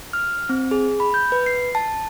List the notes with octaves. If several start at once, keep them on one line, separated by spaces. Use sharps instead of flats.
F6
C4
G#4
B5
G6
B4
C7
A5